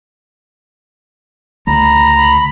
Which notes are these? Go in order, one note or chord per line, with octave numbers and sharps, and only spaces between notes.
C#2 D3 A3 A#5 B5
B5